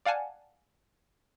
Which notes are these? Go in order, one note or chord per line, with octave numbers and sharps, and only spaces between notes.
D5 F5 F#5 G#5 A5